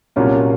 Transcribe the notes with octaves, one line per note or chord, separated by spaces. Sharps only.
C2 A#2 F#3 A#3 C#4 F4